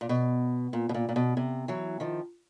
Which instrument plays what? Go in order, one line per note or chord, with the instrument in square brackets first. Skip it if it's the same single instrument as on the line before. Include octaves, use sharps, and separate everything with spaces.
[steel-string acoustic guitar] A#2
B2
A#2
B2
A#2
A#2
B2
C3
E3 F#3
D#3 F3